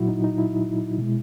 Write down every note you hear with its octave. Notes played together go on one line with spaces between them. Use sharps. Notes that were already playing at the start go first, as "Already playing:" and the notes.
Already playing: A#2 F#3 E4 F#4
D#4
D#4
E4
B2 G#3